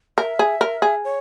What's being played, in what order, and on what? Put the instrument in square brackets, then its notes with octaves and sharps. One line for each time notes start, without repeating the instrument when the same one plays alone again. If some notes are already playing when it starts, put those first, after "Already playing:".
[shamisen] A#4 [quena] E5
[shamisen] G#4
A#4
G#4
[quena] C#5